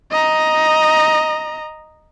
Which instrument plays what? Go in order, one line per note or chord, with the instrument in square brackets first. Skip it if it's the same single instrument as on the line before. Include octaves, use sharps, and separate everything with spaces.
[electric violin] D#5 A#5